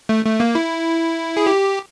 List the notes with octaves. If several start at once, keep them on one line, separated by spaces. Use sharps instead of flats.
A3
A3
A#3
E4
G#4
G4